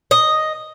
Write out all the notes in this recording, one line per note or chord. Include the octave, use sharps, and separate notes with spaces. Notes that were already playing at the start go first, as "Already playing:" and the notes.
D#5